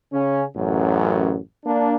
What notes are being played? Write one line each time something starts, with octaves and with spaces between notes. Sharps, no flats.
C#3 C#4
A1 F#2
A#3 D4